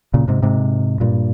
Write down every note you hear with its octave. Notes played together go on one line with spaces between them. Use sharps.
A#2 C#3
G#2 C3
G#2 C3
G2 A#2